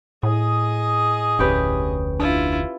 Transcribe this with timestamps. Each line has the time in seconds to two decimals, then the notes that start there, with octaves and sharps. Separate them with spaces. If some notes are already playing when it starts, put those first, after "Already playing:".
0.23 A2 G#4 D#5
1.39 F1 D2 C#4 G4 B4
2.19 D4 E4 F4